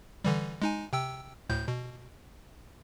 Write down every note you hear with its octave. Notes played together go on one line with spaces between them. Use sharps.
D3 E3 G3
G#3 D#4 G#5
C3 G5 E6
D2 A2 G6
B2